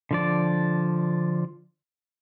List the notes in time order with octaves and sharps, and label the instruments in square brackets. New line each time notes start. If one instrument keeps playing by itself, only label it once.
[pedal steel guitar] D3 F3 D5